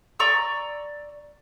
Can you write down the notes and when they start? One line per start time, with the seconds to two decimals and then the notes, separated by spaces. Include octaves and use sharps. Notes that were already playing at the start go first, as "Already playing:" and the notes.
0.20 D5 A#5 C#6 E6